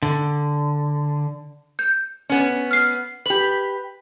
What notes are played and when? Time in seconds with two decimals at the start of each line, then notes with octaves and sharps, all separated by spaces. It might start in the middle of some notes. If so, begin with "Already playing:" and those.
0.03 D3
1.79 G6
2.29 B3 C#4
2.71 F6 C7
3.26 G4 B4 F#7